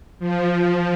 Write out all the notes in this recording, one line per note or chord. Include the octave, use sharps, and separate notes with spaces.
F3